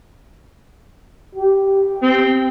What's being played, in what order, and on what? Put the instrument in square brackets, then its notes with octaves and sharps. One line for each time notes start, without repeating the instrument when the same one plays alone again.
[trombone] G4
[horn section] C4